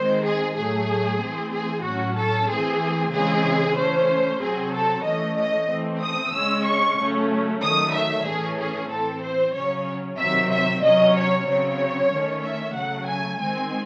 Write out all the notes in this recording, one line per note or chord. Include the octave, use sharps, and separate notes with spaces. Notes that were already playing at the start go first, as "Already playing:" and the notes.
Already playing: D#3 G#3 C4 C5
G#4
A2 F#3 A3 G#4
E3 A3 C4
G#4
A2 F#3 C#4 F#4
A4
E3 A3 C4 G#4
C#3 E3 G#3 C4 G#4
E3 A3 C#4 C5
C3 F#3 C4 G#4
A4
E3 A3 C#4 D#5
D#5
E3 A3 C4
D#6
C#3 G#3 C#4 E6
C#6
C#3 F#3 A3 C#4
D#3 F#3 A3 D#6
E5
A2 E3 A3 C#4 G#4
G#4
E3 C4 A4
C5
C#3 F#3 C#4 C#5
C3 D#3 F#3 C4 E5
E5
C3 F#3 C#4 D#5
C#5
C#3 F#3 C4 C#5
D#3 A3 C#4
E5
C#3 F#3 A3 F#5
G#5
D#3 G#3 C4 G#5